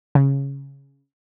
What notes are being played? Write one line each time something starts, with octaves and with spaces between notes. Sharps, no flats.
C#3